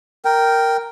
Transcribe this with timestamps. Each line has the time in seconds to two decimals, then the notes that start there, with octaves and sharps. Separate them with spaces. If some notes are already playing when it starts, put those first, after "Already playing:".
0.25 A#4 G5